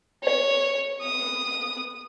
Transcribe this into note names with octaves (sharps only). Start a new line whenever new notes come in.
C#5
D#6